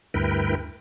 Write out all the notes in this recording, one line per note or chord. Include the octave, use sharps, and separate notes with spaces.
D2 G2 E4 A#4 B4 G5